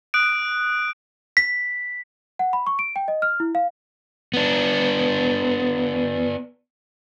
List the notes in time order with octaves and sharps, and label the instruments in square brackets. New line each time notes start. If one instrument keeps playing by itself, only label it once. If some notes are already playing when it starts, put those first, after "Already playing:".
[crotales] D#6 F#6 D7
[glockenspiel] B6
[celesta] F#5
B5
C#6
D7
G5
D#5
F6
E4
F5
[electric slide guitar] B3 D4